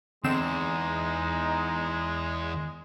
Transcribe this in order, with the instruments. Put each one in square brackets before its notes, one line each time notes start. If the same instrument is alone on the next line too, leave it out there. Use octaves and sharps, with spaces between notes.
[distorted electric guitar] E2 [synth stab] D3 C4 E7 [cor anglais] G#3 [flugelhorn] D#4